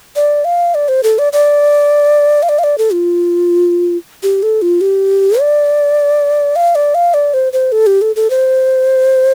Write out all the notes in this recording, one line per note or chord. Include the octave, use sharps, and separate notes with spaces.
D5
F5
D5
C5
A4
D5
D5
F5
D5
F5
D5
A4
F4
G4
A4
F4
G4
D5
F5
D5
F5
D5
C5
C5
A4
G4
A4
A4
C5